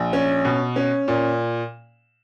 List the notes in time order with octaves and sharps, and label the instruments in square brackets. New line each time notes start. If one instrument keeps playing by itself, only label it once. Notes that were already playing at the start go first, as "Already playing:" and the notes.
Already playing: [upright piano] A#1
C#4
B2
C#4
A#2